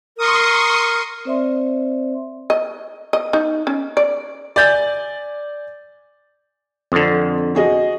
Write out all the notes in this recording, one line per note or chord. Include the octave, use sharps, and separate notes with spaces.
A#4 C6 C#6 D#6
C4 C5 D5 E5 C6
D#5
D#5
D#4
C#4
D5
D5 G#5 G6 A6
F2 D3 C4
F#4 G#4 D#5